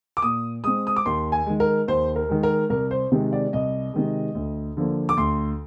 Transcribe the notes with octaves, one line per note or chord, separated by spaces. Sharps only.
D6
A#2 D#6
G#3 C4 D#6
D#6
D6
D#2 C6
G#5
D#3 G#3
A#4
D#2 C5
A#4
D#3 G#3
A#4
C2 A#4
C5
C3 D#3 G#3
D5
C2 D#5
C3 D#3 G#3
D2
D3 F3 A#3
D6
D2 C6